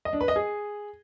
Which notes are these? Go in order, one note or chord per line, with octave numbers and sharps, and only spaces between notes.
D#5
D4
B4
D#5
G#4